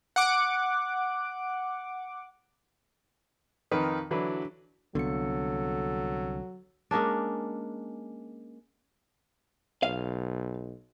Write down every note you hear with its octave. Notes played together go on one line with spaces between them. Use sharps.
F#5 D6
F2 D#3 D#4 B4
D3 E3 F#3 D4 E4 B4
C2 D3 F#3 B3 A4 C#7
G#3 A#3 C#4 D4
B1 F5